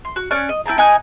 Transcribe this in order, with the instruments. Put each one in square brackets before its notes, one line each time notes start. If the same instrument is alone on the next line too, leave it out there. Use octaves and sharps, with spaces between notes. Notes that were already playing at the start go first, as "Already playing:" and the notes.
[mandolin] C6
F#4
C#4 D5 C#6 F#6
D#5
E4 G5 A5 A#5
D#4 G#5 F#6